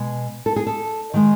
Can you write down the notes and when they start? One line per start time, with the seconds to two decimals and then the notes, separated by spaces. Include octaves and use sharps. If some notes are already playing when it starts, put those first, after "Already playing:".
Already playing: B2 G#3
0.46 A4
0.56 G#4
0.67 A4
1.14 D#3 G#3